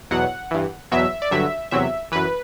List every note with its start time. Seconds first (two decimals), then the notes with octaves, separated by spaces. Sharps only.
0.11 E2 B2 F#3 F#5
0.51 G2 E3
0.92 E2 B2 F#3 E5
1.22 D5
1.31 G2 D3 F#3 E5
1.71 E2 C3 F#3 E5
2.12 F#2 E3 B4